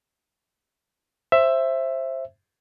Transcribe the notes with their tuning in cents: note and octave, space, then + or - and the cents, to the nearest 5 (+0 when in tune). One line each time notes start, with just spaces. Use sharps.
C5 +15 E5 +10